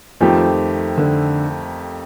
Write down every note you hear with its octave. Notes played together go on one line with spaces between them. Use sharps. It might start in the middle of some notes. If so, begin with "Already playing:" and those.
F2 D#3 F3 A3 C4 G4
D3